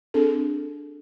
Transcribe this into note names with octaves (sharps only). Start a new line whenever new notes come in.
C4 D4 G#4 A4